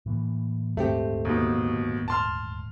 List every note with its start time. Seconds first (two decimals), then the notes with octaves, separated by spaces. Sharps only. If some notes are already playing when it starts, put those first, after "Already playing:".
0.06 A2 E3 A#3
0.77 D#1 D2 G#2 A3 C4 G4
1.25 D#2 B2
2.08 A5 C6 F6